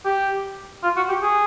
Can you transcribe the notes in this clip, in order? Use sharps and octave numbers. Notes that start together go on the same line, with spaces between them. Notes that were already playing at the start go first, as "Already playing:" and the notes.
G4
F4
F#4
G4
G#4